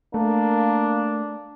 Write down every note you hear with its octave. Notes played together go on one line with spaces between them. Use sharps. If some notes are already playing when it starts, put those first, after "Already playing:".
A3 A#3 D4